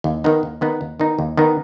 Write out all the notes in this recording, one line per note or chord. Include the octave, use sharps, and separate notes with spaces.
D#2
D#3 B3 D#4
D#2
D#3 B3 D#4
D#2
D#3 B3 D#4
D#2
D#3 B3 D#4